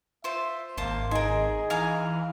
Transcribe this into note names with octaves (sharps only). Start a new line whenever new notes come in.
F4 C5 E5
G#1 A#3 C5 A5 C6
D#4 G#4 A#4 G#5
E3 F5 G#5 A#5